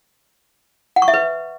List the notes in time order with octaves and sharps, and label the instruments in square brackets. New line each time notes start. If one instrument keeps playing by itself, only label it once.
[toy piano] F#5
C#6
E5
B4